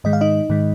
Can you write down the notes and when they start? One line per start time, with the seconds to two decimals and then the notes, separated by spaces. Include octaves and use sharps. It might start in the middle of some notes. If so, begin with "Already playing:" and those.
0.04 G#2 D#3 G#3 D#5
0.13 F5
0.21 D#4 D#5
0.49 G#2 D#3 G#3